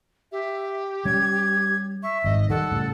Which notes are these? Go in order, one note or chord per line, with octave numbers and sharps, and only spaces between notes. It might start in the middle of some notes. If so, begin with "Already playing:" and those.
G4 E5
G3 C#4 G#6
E5 C#6
G#1 G#2 D#5
D#3 G3 A4 F#5
A2 C#3 G3